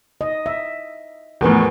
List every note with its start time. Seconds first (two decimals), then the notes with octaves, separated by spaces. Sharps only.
0.21 D#5
0.46 E5
1.41 E2 A2 F3 A#4 B4